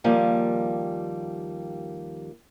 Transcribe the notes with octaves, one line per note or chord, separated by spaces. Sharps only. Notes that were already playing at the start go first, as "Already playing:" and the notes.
D#2 F3 G3 A#3 G#5